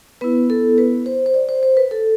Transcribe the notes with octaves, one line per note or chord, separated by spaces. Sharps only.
B3 E4 B4
A4
B4
C5
C5
D5
C5
C5
B4
A4